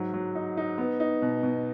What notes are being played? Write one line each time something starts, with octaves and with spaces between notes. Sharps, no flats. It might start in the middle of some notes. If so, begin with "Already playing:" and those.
Already playing: G#2 F#3
F#3
D#4
D#4
B3
D#4
B2
B2